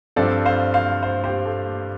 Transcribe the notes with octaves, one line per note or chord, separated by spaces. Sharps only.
G2 F3 C4 A4 D5
C5 F5
C5 F5
C5 F5
G4 C5
A4